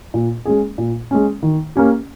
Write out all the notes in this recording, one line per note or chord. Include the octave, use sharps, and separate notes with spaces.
A#2
G#3 C#4 G#4
A#2
G#3 C#4
D#3
A#3 C#4 G4